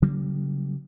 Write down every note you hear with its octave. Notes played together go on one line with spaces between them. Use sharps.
C#3 F#3 G3 A#3